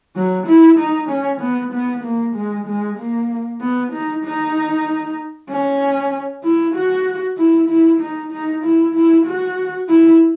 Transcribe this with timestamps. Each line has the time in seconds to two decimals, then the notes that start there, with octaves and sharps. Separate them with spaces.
0.16 F#3
0.47 E4
0.78 D#4
1.09 C#4
1.41 B3
1.73 B3
2.04 A#3
2.35 G#3
2.67 G#3
2.97 A#3
3.61 B3
3.92 D#4
4.24 D#4
5.50 C#4
6.44 E4
6.74 F#4
7.38 E4
7.68 E4
8.00 D#4
8.31 D#4
8.64 E4
8.95 E4
9.25 F#4
9.89 E4